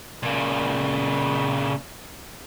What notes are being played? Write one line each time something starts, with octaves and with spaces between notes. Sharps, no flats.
A#2 C#3